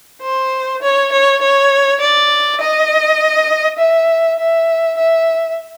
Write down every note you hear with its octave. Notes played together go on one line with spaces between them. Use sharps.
C5
C#5
C#5
C#5
D5
D#5
E5
E5
E5